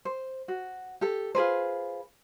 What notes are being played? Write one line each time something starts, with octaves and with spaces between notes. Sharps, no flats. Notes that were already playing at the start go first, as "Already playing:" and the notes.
C5
F#4
G4 A4
F4 G#4 B4 C5